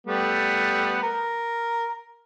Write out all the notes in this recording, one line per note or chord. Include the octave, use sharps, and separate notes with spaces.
G3 A3 B3
A#4